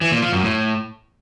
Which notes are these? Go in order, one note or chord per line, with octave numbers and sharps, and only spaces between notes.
E3
A#2
F3
F#2
A2